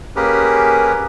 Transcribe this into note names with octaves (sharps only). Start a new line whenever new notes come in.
A#3 C#4 G4 G#4 A#4 B4